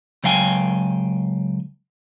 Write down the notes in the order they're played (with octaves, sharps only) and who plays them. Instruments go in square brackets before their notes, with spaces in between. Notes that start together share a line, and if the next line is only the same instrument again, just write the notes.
[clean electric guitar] C#2 F#3 F5 G5 G#5